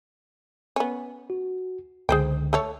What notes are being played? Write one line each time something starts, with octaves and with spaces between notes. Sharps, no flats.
B3 C#4
F#4
C#2 D3 G#4 C5 G5
A3 A4 C#5